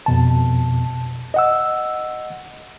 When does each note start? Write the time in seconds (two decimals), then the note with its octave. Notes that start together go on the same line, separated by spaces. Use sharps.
0.06 F2 B2 A5
1.34 D#5 F#5 E6